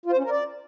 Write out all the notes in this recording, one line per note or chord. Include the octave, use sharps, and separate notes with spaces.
F4
C5
C#4
A#4
D5